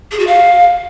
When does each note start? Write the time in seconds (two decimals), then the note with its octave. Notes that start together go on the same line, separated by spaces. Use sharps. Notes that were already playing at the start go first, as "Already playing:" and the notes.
0.12 G#4
0.19 F#4
0.27 F5